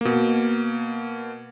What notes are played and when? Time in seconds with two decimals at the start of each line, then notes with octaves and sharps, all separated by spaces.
0.01 B2 A#3